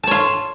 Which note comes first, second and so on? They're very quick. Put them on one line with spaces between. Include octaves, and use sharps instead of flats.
A5 C#5 F4